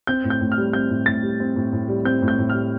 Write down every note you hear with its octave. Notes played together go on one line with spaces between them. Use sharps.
C4 G6
A2
G6
A2
F6
G3
C4 G6
A2
A2 A6
G3
C4
A2
A2
G3
C4 G6
A2
G6
A2
G3 F6